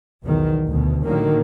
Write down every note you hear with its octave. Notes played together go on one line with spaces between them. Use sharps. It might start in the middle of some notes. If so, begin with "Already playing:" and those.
B1 E2 D#3
D2 B2
A2 D3 D#3 F#3 A#3